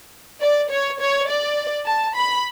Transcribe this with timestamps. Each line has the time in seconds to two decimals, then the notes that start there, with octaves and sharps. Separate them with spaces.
0.40 D5
0.69 C#5
0.99 C#5
1.28 D5
1.85 A5
2.15 B5